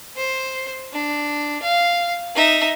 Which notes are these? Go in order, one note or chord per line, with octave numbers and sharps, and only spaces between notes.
C5
D4
F5
D#4 E5